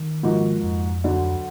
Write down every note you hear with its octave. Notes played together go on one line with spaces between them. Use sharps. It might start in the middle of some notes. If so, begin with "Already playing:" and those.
Already playing: D#3
G#2 F3 A#3 D#4 F#4
F2
D2 D3 F#3